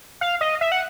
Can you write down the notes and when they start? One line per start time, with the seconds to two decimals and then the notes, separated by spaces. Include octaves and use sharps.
0.21 F5
0.41 D#5
0.61 E5
0.72 F#5